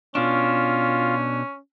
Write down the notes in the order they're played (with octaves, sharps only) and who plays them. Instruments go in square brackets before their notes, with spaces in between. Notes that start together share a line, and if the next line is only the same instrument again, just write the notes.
[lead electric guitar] B2 D4 [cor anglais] C#4 [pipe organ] F4